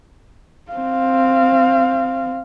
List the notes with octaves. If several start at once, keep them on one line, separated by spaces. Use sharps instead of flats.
C4 F5